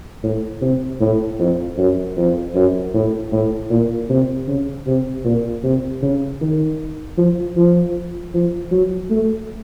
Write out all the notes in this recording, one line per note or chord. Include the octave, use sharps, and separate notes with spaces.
A2
C3
A2
F2
F#2
F2
F#2
A2
A2
A#2
C3
C#3
C3
A#2
C3
C#3
D#3
F3
F3
F3
F#3
A3